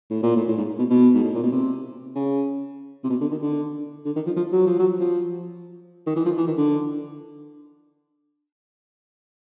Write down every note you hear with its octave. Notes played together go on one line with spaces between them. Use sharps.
A2
A#2
A2
A2
G#2
B2
B2
G#2
A2
A#2
B2
C3
C#3
C3
B2
D3
D#3
D3
D3
D#3
F3
F3
F#3
F3
F#3
F3
D#3
E3
F3
E3
D#3
D3